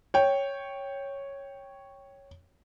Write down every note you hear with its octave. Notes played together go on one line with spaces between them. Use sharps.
C#5 G5